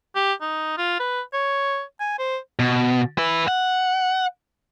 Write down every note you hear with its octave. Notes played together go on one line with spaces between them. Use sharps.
G4
D#4
F4
B4
C#5
G#5
C5
B2
E4 B4
F#5